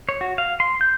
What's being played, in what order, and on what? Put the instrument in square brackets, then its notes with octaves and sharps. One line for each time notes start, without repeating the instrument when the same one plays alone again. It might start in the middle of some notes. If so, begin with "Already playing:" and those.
[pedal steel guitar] C#5
F#4
F5
C6
G6